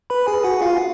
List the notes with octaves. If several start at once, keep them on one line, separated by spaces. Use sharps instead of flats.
B4 B5
G#4 G#5
F#4 F#5
F4 F5